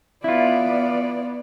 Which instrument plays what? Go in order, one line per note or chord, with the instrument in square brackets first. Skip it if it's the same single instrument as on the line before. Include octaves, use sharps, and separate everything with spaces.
[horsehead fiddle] B3 D5 [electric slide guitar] E4 F4